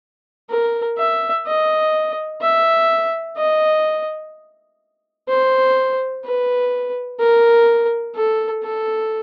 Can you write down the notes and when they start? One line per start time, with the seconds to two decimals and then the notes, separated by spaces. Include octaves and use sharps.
0.50 A#4
0.97 E5
1.46 D#5
2.41 E5
3.37 D#5
5.28 C5
6.24 B4
7.20 A#4
8.15 A4
8.63 A4